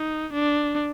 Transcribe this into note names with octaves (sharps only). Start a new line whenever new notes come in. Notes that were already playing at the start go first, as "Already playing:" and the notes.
Already playing: D#4
D4